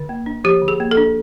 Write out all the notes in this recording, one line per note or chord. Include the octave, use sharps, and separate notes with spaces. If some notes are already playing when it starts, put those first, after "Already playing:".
Already playing: D3
A#3
D4
F3 G4
D3
G#4
A#3
A4
D4